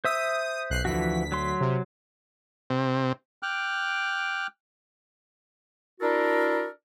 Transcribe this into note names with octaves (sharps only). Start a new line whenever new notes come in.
C5 E5 D#6 E6
B1 F#6 C7
D2 E3 F3 F#4 B6
F#3 C6
C3
C3
G5 D6 F6 F#6
D4 E4 F#4 A4 A#4